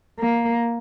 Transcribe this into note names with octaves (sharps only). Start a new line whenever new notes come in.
A#3